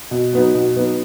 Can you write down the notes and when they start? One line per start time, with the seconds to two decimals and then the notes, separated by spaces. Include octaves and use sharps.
0.11 B2
0.33 F#3 B3 D#4
0.54 B2
0.75 F#3 B3 D#4